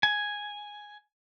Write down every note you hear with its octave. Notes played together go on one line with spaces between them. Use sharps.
G#5